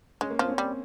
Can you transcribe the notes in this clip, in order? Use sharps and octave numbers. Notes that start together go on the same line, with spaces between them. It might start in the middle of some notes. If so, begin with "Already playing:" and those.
G#3 C#4
A#3
F3 C4
C#4
G3